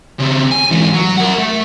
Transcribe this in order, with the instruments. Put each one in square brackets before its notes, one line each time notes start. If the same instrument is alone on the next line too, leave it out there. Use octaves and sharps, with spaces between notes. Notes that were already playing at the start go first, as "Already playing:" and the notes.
[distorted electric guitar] C#3 C4
G#5
G#2 E3
F#3
A#4 F#5
A3